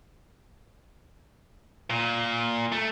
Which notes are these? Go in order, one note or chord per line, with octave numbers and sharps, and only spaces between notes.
A#2
A3